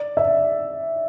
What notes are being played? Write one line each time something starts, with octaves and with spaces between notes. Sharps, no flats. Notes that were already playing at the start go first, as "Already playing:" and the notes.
Already playing: D5
E5